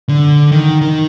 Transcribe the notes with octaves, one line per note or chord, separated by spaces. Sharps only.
D3
D#3
D#3